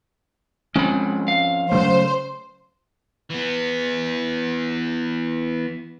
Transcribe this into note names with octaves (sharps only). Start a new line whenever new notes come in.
F3 G#3 C4 C#4 B5
F5
C#3 F#3 A3 C5
E3 B3